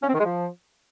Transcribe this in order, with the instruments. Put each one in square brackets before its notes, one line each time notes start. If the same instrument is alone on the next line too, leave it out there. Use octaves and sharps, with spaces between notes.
[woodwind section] C#4
C4
D#3
G#3
F3